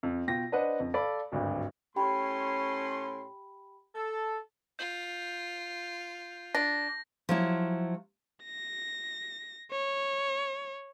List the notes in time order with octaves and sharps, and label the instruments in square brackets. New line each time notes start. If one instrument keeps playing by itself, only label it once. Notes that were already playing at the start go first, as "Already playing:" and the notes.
[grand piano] F2
B2 F4 G5 A#6
D4 B4 C5 D#5 F#5
F2
A4 D5 F5 B5
G#1 D2 G2
[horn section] A2 C#4 C6 [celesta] G4 G5 B5
[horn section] A4
[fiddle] F4 [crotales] G6
[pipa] D4 [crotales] A#6
[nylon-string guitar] F3 F#3 E4
[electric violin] A#6
C#5